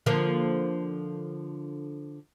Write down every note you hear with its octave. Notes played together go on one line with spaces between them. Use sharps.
D3 F3 A#3